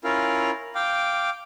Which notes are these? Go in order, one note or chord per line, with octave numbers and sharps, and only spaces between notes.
C#4 E4 F4 A#4 F5
F5 G5 D6